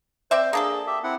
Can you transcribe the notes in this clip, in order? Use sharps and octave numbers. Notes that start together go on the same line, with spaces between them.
C4 C5 D5 E5
A#3 D4 G#4 A4
G4 E5
C4 E4 F#5